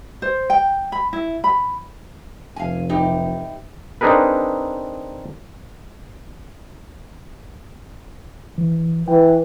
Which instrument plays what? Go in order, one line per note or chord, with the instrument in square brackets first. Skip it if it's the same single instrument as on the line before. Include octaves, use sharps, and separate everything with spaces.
[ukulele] C5
G5
B5
E4
B5
[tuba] F1 [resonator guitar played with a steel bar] F5 G#5
[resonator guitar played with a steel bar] E3 D#4 G4
[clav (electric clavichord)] C4 D4 D#4 G#4 A#4 B4
[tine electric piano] E3
[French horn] E3 [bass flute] B4 [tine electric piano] G5